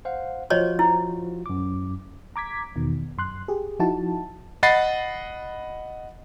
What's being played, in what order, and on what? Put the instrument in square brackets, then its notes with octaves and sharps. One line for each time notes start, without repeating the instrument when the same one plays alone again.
[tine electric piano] C5 F5 F#5
[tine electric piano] F3 F4 F#4 [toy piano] C5 C#5 D#5
[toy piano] E4
[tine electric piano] F#2 D6
[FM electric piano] A#5 D6 G#6 B6
E2 B2 D#3
F#2 C6 F#6
G4 G#4
F3 D#4 E4 F#4 A5
[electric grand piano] D#5 F#5 B5 A6 C7